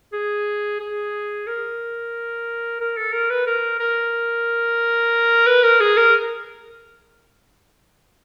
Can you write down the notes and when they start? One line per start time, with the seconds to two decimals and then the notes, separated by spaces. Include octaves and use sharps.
0.12 G#4
0.80 G#4
1.47 A#4
2.80 A#4
2.97 A4
3.12 A#4
3.30 B4
3.47 A#4
3.79 A#4
5.46 B4
5.63 A#4
5.80 G#4
5.97 A#4